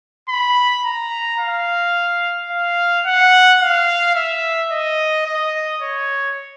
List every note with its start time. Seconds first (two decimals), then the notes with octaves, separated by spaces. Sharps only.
0.29 B5
0.85 A#5
1.40 F5
2.50 F5
3.06 F#5
3.61 F5
4.15 E5
4.71 D#5
5.26 D#5
5.82 C#5